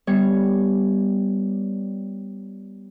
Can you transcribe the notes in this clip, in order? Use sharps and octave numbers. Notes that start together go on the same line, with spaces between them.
G3 B3 C#5